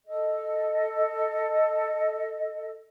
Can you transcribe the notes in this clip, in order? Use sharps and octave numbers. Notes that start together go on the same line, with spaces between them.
A4 D#5